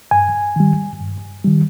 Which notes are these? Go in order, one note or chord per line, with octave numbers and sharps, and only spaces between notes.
G2 G#5
D#3 G3
G2
D#3 G3